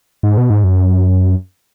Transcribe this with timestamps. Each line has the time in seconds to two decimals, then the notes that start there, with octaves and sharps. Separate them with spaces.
0.23 G#2
0.38 B2
0.50 G#2
0.64 F#2